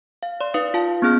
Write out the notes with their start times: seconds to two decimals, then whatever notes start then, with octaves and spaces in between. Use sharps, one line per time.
0.23 F5
0.41 D5 C6
0.54 D#4 B4 F5 D#6
0.74 F4 F5 A5
1.02 B3 C#4 G#4 F6 G6